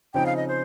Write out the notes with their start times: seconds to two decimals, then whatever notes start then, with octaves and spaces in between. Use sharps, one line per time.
0.14 C#3 F3 C4 D#4 G5
0.26 F5
0.37 D#5
0.48 C5